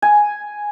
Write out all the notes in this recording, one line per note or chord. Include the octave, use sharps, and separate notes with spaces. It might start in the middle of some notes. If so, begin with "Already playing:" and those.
G#5